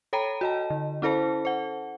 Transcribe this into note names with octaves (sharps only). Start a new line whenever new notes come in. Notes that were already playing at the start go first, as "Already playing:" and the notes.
A4 C#5 G5 A#5 B5 D#7
F#4 D#5 A5
D3
C#4 E4 A4 C5 A5
C5 F#5